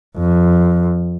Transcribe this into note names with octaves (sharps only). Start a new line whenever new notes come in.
F2